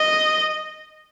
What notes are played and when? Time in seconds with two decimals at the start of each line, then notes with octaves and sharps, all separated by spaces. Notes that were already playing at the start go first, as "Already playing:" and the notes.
Already playing: D#5